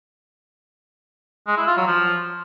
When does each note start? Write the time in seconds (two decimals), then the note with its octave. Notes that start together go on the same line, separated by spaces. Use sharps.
1.48 G#3
1.57 E4
1.67 F4
1.77 F#3
1.87 F3